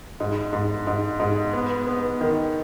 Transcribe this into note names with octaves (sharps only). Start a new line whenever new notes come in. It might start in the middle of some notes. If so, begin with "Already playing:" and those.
G#2
G#2
G#2
G#2
B3
B3
D#3